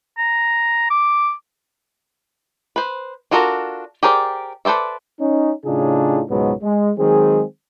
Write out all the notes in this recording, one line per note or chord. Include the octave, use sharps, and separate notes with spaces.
A#5
D6
B4 C5
D4 F4 F#4 A4 A#4
G4 G#4 A#4 C5 D5
A4 B4 C5 D5 E5
C#4 D#4
A2 C#3 D4 D#4 F4 G#4
C#2 G#2 B2 F#3 G#3 B3
G#3
D#3 F#3 G#3 C4 G#4